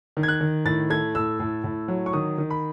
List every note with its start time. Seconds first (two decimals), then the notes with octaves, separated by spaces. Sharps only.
0.17 D#3
0.23 G#6
0.28 F#6
0.41 D#3
0.65 A2 A6
0.90 A3 G#6
1.15 A2 E6
1.40 A2
1.64 A2
1.88 F#3
2.06 C#6
2.13 D#3 D#6
2.38 D#3
2.50 B5